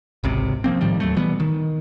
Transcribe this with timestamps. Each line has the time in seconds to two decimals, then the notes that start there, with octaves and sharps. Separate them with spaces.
0.24 G#1 C#2 C3
0.64 F3 A#3 C4
0.81 A2 D#3 F3 G3
1.00 D#2 F#3 A3
1.16 B2 E3 G3 B3
1.40 D#3